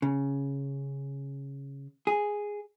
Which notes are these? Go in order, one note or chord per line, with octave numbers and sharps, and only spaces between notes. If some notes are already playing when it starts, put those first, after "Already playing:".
C#3
G#4